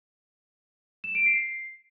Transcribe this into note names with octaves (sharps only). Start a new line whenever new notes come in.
E7
D7
C7